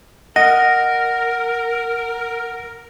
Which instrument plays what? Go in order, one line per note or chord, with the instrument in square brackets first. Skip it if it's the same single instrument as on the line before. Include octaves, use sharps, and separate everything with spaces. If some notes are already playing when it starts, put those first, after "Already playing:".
[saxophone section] A#4 [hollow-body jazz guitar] D#5 [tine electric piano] F#5 [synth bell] A#6